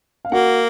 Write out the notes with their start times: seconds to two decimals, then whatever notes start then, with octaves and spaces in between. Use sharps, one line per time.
0.25 F5
0.32 A#3 F#4 F#5